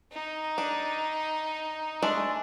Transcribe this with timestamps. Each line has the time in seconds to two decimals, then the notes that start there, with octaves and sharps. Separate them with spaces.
0.12 D#4
0.58 D4
2.02 G#3 A3 D4